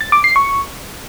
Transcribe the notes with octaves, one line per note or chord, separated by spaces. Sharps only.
A6
D6
C7
C#6